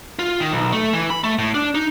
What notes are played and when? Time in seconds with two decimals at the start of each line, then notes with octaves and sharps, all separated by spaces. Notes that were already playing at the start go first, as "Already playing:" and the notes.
0.19 F4
0.40 D#3
0.53 B1
0.73 A3
0.93 E3
1.10 B5
1.24 A3
1.39 A2
1.54 D4
1.75 D#4